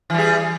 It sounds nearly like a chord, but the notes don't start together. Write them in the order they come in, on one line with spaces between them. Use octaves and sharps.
E3 G3 G#4